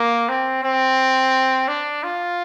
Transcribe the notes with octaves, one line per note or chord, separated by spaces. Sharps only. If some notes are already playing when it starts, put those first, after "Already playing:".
Already playing: A#3
C4
C4
D4
F4